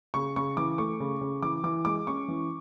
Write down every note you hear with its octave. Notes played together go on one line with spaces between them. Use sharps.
C#3 C#6
C#3 C#6
E3 D6
A3 C#6
C#3
C#3
E3 D6
E3 D6
G#3 D6
C#4 C#6
E3